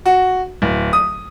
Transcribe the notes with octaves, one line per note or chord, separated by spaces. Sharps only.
F#4
D1
D#6